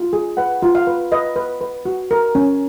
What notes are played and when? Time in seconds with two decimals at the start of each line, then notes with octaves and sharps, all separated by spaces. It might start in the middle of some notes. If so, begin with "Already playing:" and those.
Already playing: F4
0.13 G#4
0.37 B4 F#5
0.62 F4
0.75 F5
0.87 B4
1.12 B4 D#5
1.36 B4
1.61 B4
1.85 F#4
2.11 A#4
2.35 C#4